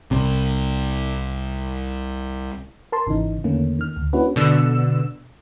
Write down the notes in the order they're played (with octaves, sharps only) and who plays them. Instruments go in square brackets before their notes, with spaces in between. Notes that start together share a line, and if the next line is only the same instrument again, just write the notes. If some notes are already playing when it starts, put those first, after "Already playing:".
[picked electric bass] C2 C3
[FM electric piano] A#4 A5 C6
G#1 C#3 E3 D#4
E2 D3 D#3 A3 A#3 C#4
D#3 F6
D2
A#3 C#4 D4 E4 F#4 B4
[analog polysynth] B2 D3 E6